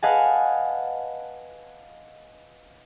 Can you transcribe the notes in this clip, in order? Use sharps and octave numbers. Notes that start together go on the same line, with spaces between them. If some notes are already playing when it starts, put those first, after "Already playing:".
B4 D#5 F5 F#5 G#5 A5